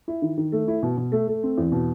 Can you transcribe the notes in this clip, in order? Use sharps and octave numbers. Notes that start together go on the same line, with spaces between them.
E4
D#3
D#3
A3
E4
B2
B2
A3
A3
C4
E2
B2